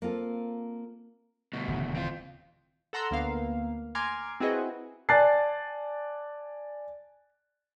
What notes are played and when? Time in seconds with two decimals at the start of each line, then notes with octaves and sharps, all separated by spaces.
0.02 A#3 C4 F4 A4
1.53 D2 B2
1.68 D#1 C#3 E3
1.95 C4 F4
2.93 A4 F#5 A#5 C6 E6
3.11 D2 A#3 B3 F5
3.95 G#5 A#5 C6 D6 F6 G#6
4.40 C4 E4 F#4 G#4 B4 D#5
5.09 D5 G#5 A5 F#6 A6 C7